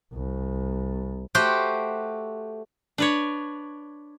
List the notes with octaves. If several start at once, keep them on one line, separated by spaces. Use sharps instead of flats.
C2
A3 F#4 G4 C5 F#5 G5
D4 B4 C#5